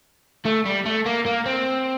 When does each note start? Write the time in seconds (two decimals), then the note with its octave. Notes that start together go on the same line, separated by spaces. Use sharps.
0.46 A3
0.66 G3
0.86 A3
1.06 A#3
1.26 A#3
1.46 C4